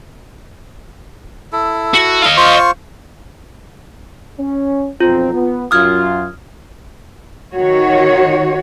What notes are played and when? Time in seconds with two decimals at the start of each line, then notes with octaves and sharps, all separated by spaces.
1.52 E4 A4
1.94 F#4
2.22 D#5 F5
2.37 F4 C5 C#6
4.37 C#4
5.00 B1 F2 C4 F4
5.33 B3
5.71 F#2 F4 D#6 F6 G#6
7.53 D#3 F#4 C#5